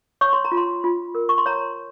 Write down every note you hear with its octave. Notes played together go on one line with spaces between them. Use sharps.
C#5 C#6
C6
A#5
F4
C6
F4
A#4
C#6
C6
C#5 A#5